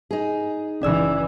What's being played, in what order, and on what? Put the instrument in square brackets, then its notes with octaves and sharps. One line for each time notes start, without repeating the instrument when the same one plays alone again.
[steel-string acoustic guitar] D#4 G#4
[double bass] F#1 E3 [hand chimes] C#4 D5 E6